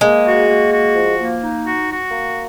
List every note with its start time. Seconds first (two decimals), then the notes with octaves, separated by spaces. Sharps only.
0.01 G#3 A#3
0.26 F#4
0.48 A#3
0.72 F#4
0.96 F3
1.19 A#3
1.42 D#4
1.65 F#4
1.89 F#4
2.12 A#3